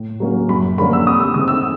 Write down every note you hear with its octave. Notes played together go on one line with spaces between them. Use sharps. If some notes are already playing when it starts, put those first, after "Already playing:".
Already playing: A2
F#3 A#3 C#4
F#2 B5
D3 F3 A#3 C#4 B5
E6
C3 D#6
E6
D#3 G#3 C4 D#6
E6